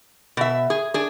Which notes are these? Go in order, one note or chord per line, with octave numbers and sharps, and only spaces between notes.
B2 E5
G#4
D4 G#4